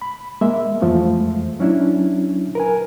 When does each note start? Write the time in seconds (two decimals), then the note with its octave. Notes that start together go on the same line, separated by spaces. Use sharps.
0.02 B5
0.41 G#3 A#3 E5
0.82 F2 E3 F3 G#3 A3
1.59 F#3 C#4 D4 E4
2.55 A#4 B4 G#5